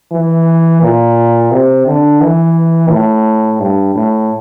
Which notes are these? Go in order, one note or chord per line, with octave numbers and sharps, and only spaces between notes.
E3
A#2
C3
D3
E3
A2
G2
A2